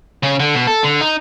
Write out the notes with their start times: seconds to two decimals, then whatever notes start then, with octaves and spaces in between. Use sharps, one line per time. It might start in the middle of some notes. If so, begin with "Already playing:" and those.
0.23 C#3 C#4
0.40 D3
0.54 B2
0.67 A4
0.84 D3
1.01 D#4